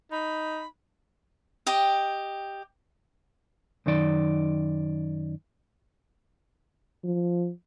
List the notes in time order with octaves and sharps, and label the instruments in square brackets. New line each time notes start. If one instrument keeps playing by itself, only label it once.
[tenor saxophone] D#4 [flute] B5
[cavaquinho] G4 D#5 G5
[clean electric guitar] F#2 D#3 D#4 D5
[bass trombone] F3